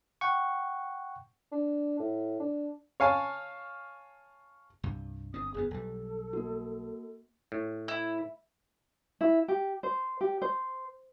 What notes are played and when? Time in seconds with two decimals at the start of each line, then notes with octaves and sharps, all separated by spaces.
0.21 F#5 G5 C#6
1.52 D4
1.99 A2
2.40 D4
3.00 C#5 F5 G#5 A5
4.83 C2 G2 C3
5.34 G1 D3 C4 D#6
5.54 G1 F2 B3 G#4
5.71 B1 G3 A4
6.33 A#3 F#4
7.52 A2
7.88 E4
9.21 E4
9.48 G4
9.83 C5
10.21 G4
10.42 C5